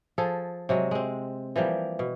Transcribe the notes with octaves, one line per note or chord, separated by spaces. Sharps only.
F3 G#4 A4
C3 F#3 G#3
G#3 C4
E3 F3 G3 A#3
B2